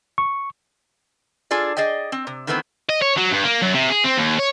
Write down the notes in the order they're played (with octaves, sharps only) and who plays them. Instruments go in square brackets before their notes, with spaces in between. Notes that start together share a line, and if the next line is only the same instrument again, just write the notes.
[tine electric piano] C#6
[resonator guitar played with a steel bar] D4 F4 G#4 A4 D5
G#4 D5 D#5 G5
C4
C3
D#3 E3 A3 B3 C4
[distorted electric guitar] D#5
C#5
F#3
G2
A#3
F#2
C3
G#4
C4
D#2
C#5